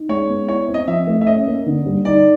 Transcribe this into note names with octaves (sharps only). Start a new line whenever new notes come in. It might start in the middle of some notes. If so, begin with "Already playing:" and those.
Already playing: D#4
G#3 C#5
B3
E4 C#5
C4
D#5
F3 E5
A3
E5
C#4 D#5
A#3
D3
G3
D#4 D5